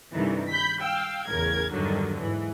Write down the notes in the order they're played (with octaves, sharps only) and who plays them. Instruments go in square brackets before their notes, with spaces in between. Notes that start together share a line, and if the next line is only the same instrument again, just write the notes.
[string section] G2 C3 D#3 E3 A3
B5 G6 B6
F5 G5 E6
A1 E2 C#3 A#4 G#6
E2 G2 D3 D#3 F#3
G#2 E3